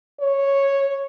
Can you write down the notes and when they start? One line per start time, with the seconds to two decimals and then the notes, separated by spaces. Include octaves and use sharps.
0.21 C#5